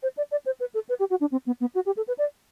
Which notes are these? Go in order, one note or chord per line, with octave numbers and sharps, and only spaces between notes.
C5
D5
D5
C5
B4
A4
B4
G4
F#4
D4
C4
B3
B3
F#4
G4
A4
B4
D5